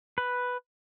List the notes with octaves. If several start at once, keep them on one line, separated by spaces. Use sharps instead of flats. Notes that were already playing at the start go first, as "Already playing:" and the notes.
B4